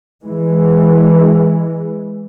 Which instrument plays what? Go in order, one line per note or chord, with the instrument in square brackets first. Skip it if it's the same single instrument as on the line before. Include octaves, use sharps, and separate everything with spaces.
[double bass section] E3 G#3